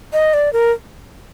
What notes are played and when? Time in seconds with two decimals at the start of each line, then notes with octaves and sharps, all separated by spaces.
0.13 D#5
0.34 D5
0.53 A#4